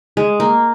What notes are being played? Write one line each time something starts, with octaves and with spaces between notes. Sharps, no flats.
G#3
A#3